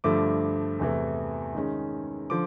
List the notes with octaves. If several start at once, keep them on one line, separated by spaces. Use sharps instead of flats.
G2 D3 F3 A3 D6
E2 C3 E3 A3
D#3 G#3 C#4
D3 F3 D6